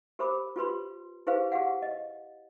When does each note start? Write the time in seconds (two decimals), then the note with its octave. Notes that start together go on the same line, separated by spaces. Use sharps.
0.19 G4 A#4 C5 B5 D6
0.56 F4 G4 B4 C6
1.27 E4 G4 G#4 B4 C5 F5
1.52 G4 G#4 F5 F#5
1.82 D#5